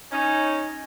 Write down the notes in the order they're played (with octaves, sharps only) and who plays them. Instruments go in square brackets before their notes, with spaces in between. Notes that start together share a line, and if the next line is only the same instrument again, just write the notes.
[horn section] C#4 D#4